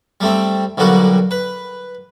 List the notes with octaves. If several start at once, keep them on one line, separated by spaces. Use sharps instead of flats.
G3 A3 C4
B1 D3 G3 A#3 F#4
B4